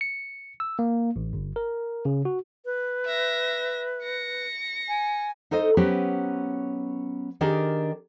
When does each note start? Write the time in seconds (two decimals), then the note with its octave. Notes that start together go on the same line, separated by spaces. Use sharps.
0.01 C#7
0.60 E6
0.79 A#3
1.16 A1
1.33 G1
1.56 A#4
2.05 C#3
2.25 F#4
2.65 B4
3.05 E5 A#6
4.03 A#6 C#7
4.88 G#5
5.51 D#4 A4 C5 D#5
5.77 F#3 B3 C#4 G4 B4 C5
7.41 D#3 D4 G4 G#4 A#4